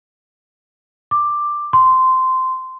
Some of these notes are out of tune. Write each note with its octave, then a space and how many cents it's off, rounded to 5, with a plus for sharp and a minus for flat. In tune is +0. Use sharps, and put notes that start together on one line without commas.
D6 +10
C6 -15